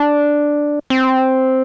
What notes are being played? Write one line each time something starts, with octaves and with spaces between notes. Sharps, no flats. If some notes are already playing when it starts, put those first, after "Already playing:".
Already playing: D4
C4